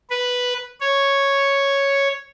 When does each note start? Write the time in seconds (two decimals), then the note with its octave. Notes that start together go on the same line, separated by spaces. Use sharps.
0.10 B4
0.80 C#5